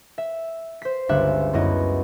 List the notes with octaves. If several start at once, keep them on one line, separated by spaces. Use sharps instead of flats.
E5
C5 B6
G1 C#2 G3 E5 F#6
F#2 B3 E4 D#5